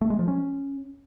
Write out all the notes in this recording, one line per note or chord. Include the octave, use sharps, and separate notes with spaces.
A3
G#3
F3
C#4